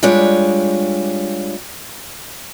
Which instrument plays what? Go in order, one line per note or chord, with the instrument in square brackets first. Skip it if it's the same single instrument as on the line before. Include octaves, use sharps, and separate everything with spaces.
[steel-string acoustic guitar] G3 G#3 D4 F4 C#5